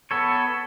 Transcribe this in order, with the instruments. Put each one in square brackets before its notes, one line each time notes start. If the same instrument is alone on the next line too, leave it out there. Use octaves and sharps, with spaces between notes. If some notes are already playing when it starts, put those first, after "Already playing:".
[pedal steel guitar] B3 A4 C#5